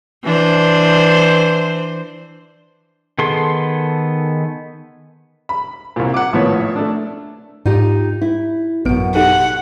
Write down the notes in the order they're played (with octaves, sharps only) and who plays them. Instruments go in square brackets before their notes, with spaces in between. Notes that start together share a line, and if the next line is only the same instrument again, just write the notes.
[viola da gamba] E3 D4 C5
[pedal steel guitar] D#3 B3 G#4 A4 C6
[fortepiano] B5
C2 A#2
F#5 D6
G#1 A2 F3 A#3 B3 C#5
A3 D4
[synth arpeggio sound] G#2 [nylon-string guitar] D#4 F4 G4
[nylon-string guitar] E4
[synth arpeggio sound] A1 B3 D7 [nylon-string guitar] F#2 B2
[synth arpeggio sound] D#4 G4 A4 [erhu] F#5